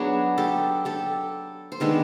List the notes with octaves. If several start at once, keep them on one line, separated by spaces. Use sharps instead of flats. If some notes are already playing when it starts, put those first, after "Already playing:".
Already playing: F#3 B3 D4 F#4 G#4
G4 A4
G4 A4
C5
D#3 G#3 B3 D4 A4 B4